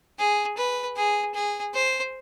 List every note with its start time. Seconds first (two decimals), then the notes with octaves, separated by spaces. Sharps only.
0.19 G#4
0.58 B4
0.97 G#4
1.34 G#4
1.74 C5